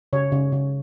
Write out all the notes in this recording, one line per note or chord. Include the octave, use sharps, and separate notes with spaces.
C#3 C#5
C#3
C#3